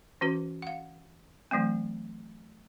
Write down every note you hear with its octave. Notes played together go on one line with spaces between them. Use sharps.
E3 C#4 F#4 B4
F5 F#5
E3 F#3 A3 C4